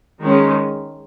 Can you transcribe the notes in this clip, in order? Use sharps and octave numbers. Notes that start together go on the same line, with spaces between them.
D#3 G#3 C#4